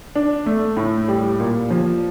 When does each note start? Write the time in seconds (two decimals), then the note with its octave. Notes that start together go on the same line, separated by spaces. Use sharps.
0.16 D4
0.46 A3
0.77 A2
1.08 G3
1.40 A#2
1.70 F3